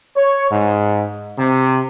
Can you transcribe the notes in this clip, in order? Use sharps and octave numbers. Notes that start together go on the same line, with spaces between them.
C#5
G#2
C3